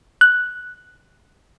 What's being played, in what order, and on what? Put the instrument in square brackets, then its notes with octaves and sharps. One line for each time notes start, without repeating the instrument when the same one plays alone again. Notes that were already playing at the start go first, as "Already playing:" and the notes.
[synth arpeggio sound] F#6